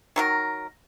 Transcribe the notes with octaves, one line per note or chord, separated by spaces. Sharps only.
D#3 F#3 A#4